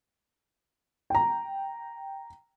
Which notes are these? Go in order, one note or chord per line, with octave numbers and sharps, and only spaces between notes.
G5 A#5